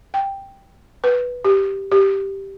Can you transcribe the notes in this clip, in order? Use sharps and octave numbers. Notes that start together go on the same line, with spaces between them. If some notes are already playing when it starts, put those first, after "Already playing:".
G5
B4
G4
G4